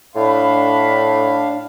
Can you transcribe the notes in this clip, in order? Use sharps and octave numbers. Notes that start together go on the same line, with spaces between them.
A2 D4 F5 B5